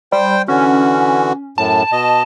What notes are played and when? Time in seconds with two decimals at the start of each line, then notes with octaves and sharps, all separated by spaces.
0.12 G3 C5 G5
0.48 D3 E3 C#4 F#4
1.58 F#2 A2 A5
1.92 B2 D#5